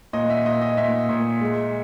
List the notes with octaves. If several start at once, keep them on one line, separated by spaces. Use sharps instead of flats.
A#2 D#5
E5
A#2 D#5
D#5
A#2 E5
A#2
G#3